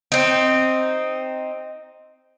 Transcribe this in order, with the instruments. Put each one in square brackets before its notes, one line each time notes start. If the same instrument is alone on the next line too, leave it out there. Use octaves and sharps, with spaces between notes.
[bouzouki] C4 D#4